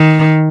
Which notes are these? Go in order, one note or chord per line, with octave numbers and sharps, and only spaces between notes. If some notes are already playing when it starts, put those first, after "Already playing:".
Already playing: D#3